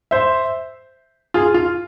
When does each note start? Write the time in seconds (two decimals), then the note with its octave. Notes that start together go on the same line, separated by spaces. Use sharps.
0.11 C5 E5
1.34 F4 G#4
1.54 F4